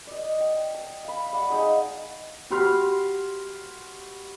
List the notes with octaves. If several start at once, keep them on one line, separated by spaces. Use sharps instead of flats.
D5 D#5
G5
A5
F5 B5
D5 F5 F#5 A5
G#3 D#4 G#4
F#4 G4 B5 C6 F6